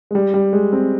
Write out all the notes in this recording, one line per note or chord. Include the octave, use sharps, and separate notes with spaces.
G#3
G3
G3
G#3
C4